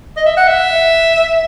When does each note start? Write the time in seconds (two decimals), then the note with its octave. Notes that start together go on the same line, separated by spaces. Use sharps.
0.17 D#5
0.26 E5
0.37 F#5
0.48 E5